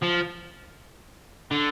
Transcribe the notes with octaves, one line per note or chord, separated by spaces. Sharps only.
F3
D3